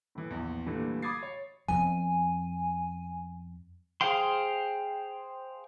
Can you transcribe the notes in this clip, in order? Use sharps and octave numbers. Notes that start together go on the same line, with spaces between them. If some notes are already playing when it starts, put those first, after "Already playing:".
A2 E3
A#1 E2
A#2 D3 E3 G3 A3
B5 D6 D#6 G#6 A6 C7
C#5
F2 B3 G#5
G#4 C5 F5 G5 C6